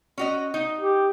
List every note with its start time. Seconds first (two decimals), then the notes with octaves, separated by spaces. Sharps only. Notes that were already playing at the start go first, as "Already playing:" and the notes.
0.18 C#4 F#4 D#5
0.54 D#4
0.79 G4